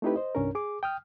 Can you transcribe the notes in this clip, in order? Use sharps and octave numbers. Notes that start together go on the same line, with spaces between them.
A3 C4 D#4 E4 G4 B4
C5 D#5
C2 G2 C#4 D4 A#4
G#4 D6
G5 D#6 F6